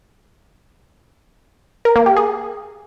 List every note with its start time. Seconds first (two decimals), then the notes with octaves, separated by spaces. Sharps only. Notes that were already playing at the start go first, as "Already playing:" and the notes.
1.85 A#4
1.96 A#3
2.06 G4
2.17 G#4